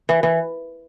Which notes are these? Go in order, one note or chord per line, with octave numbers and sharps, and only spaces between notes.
E3
E3